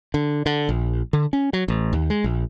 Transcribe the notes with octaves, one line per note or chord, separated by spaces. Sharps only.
D3
D3
A#1
D3
C#4
F#3
A1
D#2
G#3
A#1